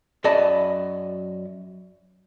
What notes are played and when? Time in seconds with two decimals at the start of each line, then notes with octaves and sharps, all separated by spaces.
0.24 F#2 F#3 D5 D#5 A5 B5